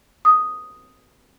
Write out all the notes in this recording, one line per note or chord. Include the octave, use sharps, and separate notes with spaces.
D#6